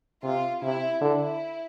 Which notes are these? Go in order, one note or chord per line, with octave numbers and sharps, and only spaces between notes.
C3 F4
C3 E4
D3 E4